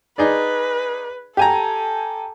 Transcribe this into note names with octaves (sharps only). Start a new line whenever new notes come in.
D#4 G#4 B4 D5
G4 A4 G#5 A#5